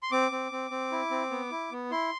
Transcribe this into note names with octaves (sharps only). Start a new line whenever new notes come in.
C6
C4 D6
C4
C4
C4
E4
C4
B3
E4
B3
E4 C6